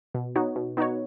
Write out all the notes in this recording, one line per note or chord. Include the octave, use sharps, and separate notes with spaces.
B2
B3 D#4 F#4 C#5
B2
B3 D#4 F#4 C#5